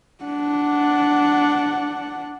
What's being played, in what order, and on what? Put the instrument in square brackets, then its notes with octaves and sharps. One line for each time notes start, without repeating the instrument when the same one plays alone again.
[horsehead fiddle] D4 F#5